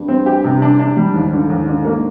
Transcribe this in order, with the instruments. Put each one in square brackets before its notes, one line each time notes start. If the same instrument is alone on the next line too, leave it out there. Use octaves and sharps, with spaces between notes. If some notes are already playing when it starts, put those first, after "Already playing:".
Already playing: [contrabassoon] G2
[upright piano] C4
G4
C3
D4
D4
G3
[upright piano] D#2 [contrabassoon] G#2
[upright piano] D3
D#2
D3
A#3